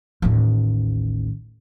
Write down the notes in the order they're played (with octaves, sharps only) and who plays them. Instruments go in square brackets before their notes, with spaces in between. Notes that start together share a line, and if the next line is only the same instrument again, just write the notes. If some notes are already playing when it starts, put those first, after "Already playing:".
[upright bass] A1 D#2